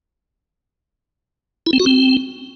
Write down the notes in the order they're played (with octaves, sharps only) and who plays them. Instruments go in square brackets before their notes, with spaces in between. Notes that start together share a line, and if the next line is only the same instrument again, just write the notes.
[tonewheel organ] E4
C4
F#4
C4